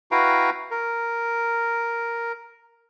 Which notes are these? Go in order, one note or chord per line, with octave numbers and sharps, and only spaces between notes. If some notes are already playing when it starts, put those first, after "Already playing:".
E4 F#4 B4 F5 G5 A#5
A#4